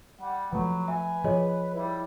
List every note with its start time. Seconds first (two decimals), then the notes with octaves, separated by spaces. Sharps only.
0.21 G3 F#5
0.53 F3 F#3 A3 B4
0.88 E5 G#5
1.24 F3 G#4 C#5 D#5
1.75 G3 E4